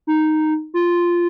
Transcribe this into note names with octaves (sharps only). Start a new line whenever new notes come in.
D#4
F4